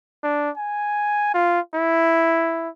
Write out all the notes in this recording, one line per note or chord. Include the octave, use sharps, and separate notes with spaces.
D4
G#5
F4
E4